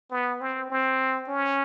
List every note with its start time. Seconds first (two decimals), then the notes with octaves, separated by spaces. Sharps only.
0.11 B3
0.41 C4
0.70 C4
1.28 C#4